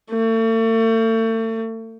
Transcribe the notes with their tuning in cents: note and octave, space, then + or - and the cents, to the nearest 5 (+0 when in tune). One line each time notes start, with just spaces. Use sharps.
A3 +40